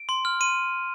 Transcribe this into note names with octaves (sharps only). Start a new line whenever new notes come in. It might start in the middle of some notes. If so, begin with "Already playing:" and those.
Already playing: D7
C6
F6
C6 D#7